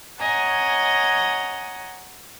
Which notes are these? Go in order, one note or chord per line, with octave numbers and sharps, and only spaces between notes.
C#5 D#5 F#5 G#5 A#5